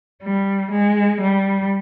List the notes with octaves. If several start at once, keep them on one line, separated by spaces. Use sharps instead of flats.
G3
G#3
G3